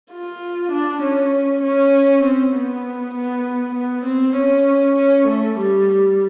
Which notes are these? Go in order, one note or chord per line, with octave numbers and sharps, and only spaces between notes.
F4
D4
C#4
C#4
C4
B3
B3
B3
C4
C#4
C#4
A3
G3